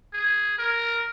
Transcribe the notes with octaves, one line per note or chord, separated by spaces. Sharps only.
G#4
A#4